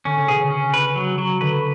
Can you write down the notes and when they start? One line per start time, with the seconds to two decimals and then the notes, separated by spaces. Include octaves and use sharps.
0.05 D3 C#4
0.17 C#3
0.28 B2 G#4
0.40 C#3
0.50 C#4
0.74 B4
0.96 F#3
1.18 F#3
1.41 D3 B4